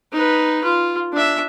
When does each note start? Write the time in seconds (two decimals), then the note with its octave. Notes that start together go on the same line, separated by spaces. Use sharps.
0.12 D#4 B4
0.64 F4
1.13 D4 E5